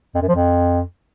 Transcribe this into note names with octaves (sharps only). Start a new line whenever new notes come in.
F2
F#2
F3
F2